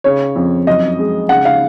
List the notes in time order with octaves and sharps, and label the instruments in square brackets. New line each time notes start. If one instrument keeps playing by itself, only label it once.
[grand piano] C#3 C#5
F2
F#2 D#5
G#3
C#3 F#5
F5